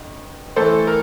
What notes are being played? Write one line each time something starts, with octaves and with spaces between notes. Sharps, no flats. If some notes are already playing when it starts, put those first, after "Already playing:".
Already playing: G1 F2
A1 A2 E3 A3 A4 C5
A#4